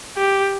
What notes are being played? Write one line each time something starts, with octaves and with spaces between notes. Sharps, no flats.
G4